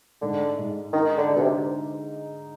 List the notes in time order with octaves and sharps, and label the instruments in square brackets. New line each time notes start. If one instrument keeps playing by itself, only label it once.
[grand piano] G#2 [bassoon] D3
[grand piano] G#2
[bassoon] D#3 [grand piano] D#4
[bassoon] D3
[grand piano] D3
[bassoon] B2
C3